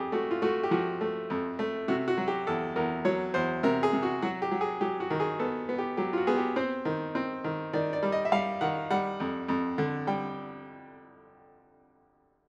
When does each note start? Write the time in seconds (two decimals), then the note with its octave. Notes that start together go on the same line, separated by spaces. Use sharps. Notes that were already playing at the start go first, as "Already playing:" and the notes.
Already playing: F2 G4 G#4
0.12 A3 F#4
0.31 F4
0.42 A3 F#4
0.63 G4
0.71 F3 F#4
1.01 A3
1.30 F2
1.59 A3
1.88 C3 F#4
2.08 F#4
2.17 F#3
2.28 G4
2.47 E2 A4
2.76 E2 A#4
3.05 F#3 C#5
3.34 E2 C5
3.63 C3 A#4
3.83 G#4
3.93 C3
4.03 F#4
4.22 F#3 F#4
4.42 G4
4.51 F#3
4.61 G#4
4.81 F#3 G4
5.00 F#4
5.10 D#3
5.20 G#4
5.39 B3 A4
5.69 B3
5.78 G4
5.97 F#3 G4
6.13 F4
6.17 F#4
6.27 B3 G#4
6.37 G4
6.56 C4 C5
6.85 D#3
7.15 C4
7.44 D#3
7.73 D#3 D5
7.93 D5
8.03 G3
8.12 D#5
8.25 E5
8.32 G3 F5
8.61 D#3 F#5
8.91 G3 F#5
9.20 F2
9.48 F2
9.78 D3
10.07 G3 G5